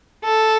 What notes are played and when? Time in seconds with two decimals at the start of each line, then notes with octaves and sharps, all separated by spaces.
0.24 A4